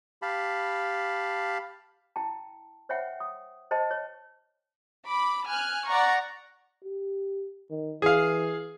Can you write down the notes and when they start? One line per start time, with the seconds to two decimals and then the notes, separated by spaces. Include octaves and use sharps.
0.22 G4 F5 A5 B5
2.16 E4 G5 A5
2.89 C5 C#5 E5 F#5 G5
3.20 D#6
3.71 C5 D#5 G5 A5
3.91 C#5
5.08 B5 D6
5.47 G#5 F6 F#6
5.87 D5 F#5 A#5 C#6
6.84 G4
7.70 D#3
8.02 E3 G#4 F5